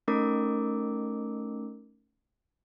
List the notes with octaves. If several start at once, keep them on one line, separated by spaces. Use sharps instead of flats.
A3 C#4 D#4 A#4 D6